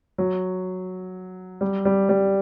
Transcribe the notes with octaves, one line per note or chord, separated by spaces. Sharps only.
F#3
G3
G3
G3